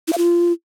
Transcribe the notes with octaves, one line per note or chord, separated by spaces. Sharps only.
E4
F5
F4